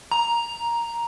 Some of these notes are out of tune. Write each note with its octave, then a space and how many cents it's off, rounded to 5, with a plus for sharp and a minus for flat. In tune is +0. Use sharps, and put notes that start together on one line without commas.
A#5 +5